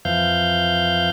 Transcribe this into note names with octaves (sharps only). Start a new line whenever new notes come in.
F2 E3 F3 F5 G6